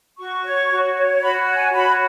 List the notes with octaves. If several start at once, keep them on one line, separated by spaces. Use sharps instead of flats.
F#4 C#6
C#5
F#4
C#5
F#4 B5
C#5
G#5
F#4 B5